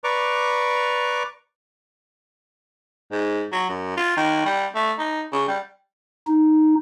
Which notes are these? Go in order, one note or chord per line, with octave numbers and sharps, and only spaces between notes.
B4 D5 A#5 C#6 D6
G#2
F#3
F#2
F4
D#3
G3
A3
D#4
C#3
G3
D#4